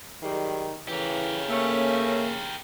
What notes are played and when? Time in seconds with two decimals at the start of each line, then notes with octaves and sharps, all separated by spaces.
0.23 D#3 F#3 G3 G#4
0.88 A2 C#3 E3 G4 A#4
1.49 A3 A#3 C#4 A4